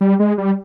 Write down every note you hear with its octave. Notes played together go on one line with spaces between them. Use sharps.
G3
G#3
G3